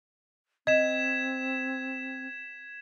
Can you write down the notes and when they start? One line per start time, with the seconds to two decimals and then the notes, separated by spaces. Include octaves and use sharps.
0.67 C4 D#5 G#6 B6 E7